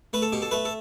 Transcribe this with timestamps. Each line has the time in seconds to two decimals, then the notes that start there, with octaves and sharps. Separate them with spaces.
0.13 A3 B4
0.22 A4
0.32 B2 G4
0.42 A4
0.51 A3 B4
0.65 A4